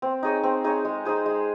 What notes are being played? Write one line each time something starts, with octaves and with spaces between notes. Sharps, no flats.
C4
D#4 G#4 C#5
C4
D#4 G#4 C#5
G#3
D#4 G#4 C5
G#3